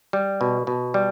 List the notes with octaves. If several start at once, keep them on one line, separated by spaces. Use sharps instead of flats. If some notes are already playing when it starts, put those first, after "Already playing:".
G3
B2
B2
G3